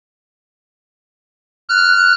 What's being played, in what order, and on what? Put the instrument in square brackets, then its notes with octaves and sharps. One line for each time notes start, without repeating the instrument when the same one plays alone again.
[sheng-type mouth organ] F6 [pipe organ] F#6